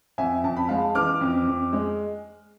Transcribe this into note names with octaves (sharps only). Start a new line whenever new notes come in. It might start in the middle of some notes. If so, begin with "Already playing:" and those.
F2 E5 G#5
F2 A5
B5
G#3 F5 A5
E3 D6 F6
F2
F2
G#3